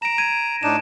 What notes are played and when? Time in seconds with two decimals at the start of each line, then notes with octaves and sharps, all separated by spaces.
0.02 A#5 D7 E7
0.18 G#6 D7 D#7
0.63 A2 D4 D#4 E7